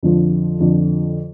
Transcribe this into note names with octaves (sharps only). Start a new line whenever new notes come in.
F2 D3 F3
F2 D3 F3